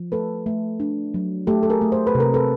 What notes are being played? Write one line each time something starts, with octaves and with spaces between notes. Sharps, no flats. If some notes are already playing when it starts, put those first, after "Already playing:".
Already playing: F3
A3 A4 B4
A3
D4
F#3
A3 G4 A4
A4
G#4 A#4
A3
C5
B4
C3
A#4
A4 B4